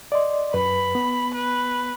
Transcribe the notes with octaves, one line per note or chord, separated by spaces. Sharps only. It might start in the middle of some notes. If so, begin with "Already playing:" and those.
D5 D#5 C6
F#2 B4 B5
B3
B4